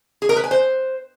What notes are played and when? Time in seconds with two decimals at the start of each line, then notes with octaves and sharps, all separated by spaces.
0.22 G#4
0.29 A#4
0.36 B4
0.44 G#5
0.51 C5